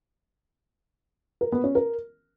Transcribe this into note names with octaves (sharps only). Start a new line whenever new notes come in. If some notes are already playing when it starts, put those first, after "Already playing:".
A#4
B3
C#4
A#4